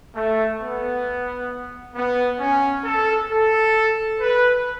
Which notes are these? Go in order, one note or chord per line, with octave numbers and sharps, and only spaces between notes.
A3
B3
B3
C#4
A4
A4
B4